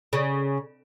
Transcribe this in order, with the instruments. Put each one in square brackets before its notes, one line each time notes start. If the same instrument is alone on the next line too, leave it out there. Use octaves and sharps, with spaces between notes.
[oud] C#3